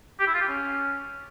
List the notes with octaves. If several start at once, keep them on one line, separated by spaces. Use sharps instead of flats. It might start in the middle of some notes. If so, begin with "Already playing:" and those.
G4
E4
F4
G4
C#4